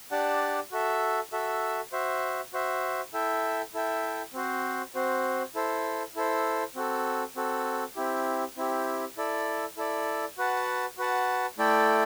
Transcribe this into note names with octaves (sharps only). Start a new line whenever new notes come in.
D4 G4 D5 F#5 A5
F#4 A4 E5
F#4 A4 E5
F#4 C5 E5
F#4 C5 E5
E4 A4 E5 G5
E4 A4 E5 G5
C4 F#4 C5
C4 F#4 C5
E4 A4 C5
E4 A4 C5
C4 F#4 A4
C4 F#4 A4
C4 E4 G4
C4 E4 G4
E4 A4 D5
E4 A4 D5
F#4 B4 F#5 A5
F#4 B4 F#5 A5
A3 E4 A4 D5 G5